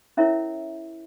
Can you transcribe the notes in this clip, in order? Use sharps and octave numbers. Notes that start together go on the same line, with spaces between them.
C#4 E4 A#4 C#5 E5